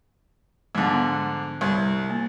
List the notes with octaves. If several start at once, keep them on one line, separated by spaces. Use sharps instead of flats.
G#2 D3 F3 G3 B3
C2
A#3